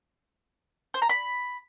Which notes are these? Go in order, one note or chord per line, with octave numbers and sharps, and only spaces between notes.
C5
A#5
B5